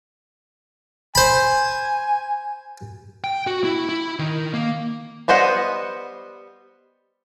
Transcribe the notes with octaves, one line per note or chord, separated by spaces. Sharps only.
C5 G#5 B5
G5
F#4
E4
E4
D#3
A#3
G3 B3 C5 D#5 F#5